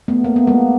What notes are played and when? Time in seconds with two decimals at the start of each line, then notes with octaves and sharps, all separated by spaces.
0.08 A3 B3
0.24 A#3
0.36 B3
0.47 G#3 A#3